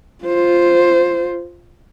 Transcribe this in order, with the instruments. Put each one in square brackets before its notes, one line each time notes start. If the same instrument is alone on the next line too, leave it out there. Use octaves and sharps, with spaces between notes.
[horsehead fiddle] F4 C5